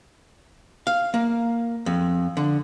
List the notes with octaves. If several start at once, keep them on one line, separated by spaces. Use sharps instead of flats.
F5
A#3
F2
D3